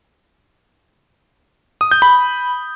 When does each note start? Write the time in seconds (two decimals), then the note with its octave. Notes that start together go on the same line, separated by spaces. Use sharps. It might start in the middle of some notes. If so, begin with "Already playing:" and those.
1.81 D#6
1.91 G6
2.02 B5